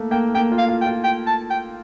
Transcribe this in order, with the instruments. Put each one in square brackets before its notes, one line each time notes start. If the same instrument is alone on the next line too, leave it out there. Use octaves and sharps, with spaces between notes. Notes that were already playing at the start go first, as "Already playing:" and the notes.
Already playing: [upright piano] A3 A#3
[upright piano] A#3 [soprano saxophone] G5
[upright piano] A#3 [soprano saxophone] G5
[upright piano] F4
[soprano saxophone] F5
[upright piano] F4
[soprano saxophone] G5
[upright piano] F4
[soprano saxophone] G5
A5
G5